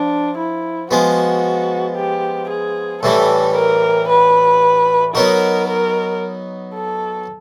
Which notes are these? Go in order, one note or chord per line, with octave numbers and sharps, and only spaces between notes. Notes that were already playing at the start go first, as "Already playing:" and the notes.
Already playing: F3 D4
E4
F3 G#3 B3 F#4
G4
G#4
A2 E3 G3 A4
A#4
B4
F#3 B3 D#4 F#4 A#4
A#4
A4